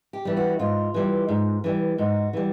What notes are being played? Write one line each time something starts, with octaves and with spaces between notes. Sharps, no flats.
G4
E3 G3
F#4
G#2 F4
E3 G3
G#2
E3 G3
G#2 F#4
E3 G3